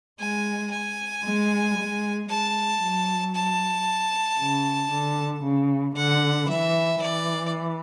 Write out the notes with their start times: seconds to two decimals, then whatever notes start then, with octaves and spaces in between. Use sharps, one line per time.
0.20 G#3 G#5
0.72 G#5
1.25 G#3
1.77 G#3
2.29 G#3 A5
2.82 F#3
3.35 A5
4.39 C#3
4.91 D3
5.44 C#3
5.96 D3 F#5
6.49 E3 E5
7.01 E3 D5